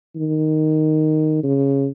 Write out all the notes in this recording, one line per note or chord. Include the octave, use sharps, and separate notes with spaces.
D#3
C#3